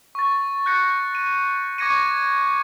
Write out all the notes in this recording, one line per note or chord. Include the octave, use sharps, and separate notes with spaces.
C#6 A6
F#6 G6 A#6 C#7
D#7
C#6 D6 G#6 A#6 C#7 D#7